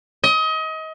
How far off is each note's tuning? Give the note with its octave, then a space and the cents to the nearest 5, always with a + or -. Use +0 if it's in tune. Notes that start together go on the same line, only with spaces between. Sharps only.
D#5 +30